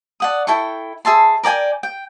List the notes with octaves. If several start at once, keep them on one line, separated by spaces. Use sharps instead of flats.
D5 F#5 D#6
E4 A4 G5 C#6
G#4 E5 A5 C6
A#4 D5 G5 G#5
G5